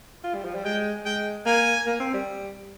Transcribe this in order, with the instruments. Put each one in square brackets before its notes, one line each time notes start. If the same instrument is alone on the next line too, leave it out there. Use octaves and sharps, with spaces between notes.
[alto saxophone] F4
G3
F3
G3
[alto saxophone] G#3 [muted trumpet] G5
[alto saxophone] G#3 [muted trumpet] G5
[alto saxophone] A#3 [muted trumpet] G#5
[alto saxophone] A#3
C4
G3